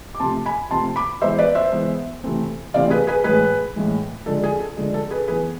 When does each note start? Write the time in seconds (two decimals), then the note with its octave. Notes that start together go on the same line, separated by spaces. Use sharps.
0.15 D6
0.20 C3 F3 A3 C4 A5 C6
0.46 G#5 B5
0.71 C3 F3 A3 C4 A5 C6
0.96 B5 D6
1.22 E3 G#3 B3 C5 E5
1.39 B4 D5
1.55 C5 E5
1.72 E3 G#3 B3
2.24 C3 E3 A3 C4
2.74 C3 E3 A3 C4 D5 F5
2.90 G#4 B4
3.07 G#4 B4
3.24 A2 E3 G#3 G#4 B4
3.76 A2 E3 G#3
4.26 D3 F3 G#3 A4
4.44 G#4
4.60 A4
4.77 D3 F3 G#3 G#4
4.94 A4
5.11 G#4 B4
5.28 E3 B3 G#4 B4